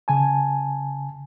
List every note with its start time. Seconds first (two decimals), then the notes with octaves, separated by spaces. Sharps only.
0.08 C#3 G#5 A5